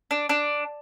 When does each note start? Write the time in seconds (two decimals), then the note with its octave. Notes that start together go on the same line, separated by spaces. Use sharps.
0.11 D4
0.29 D4